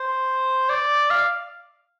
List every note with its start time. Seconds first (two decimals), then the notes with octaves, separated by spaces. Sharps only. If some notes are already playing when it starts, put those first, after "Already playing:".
Already playing: C5
0.69 D5
1.10 F5